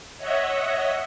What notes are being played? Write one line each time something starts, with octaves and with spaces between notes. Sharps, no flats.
C#5 D#5 E5 F#5